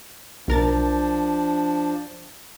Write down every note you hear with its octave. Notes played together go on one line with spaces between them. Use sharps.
B1 F3 D4 A#4 A6